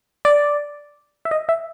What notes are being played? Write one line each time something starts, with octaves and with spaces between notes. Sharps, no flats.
D5
E5
D#5
E5